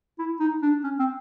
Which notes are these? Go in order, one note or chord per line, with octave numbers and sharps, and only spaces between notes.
E4
D#4
D4
C#4
C4